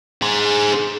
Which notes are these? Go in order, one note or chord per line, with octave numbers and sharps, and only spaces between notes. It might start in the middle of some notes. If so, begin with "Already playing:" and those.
G#4 C5